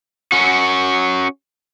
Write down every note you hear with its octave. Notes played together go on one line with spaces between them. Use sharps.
C#4 F#4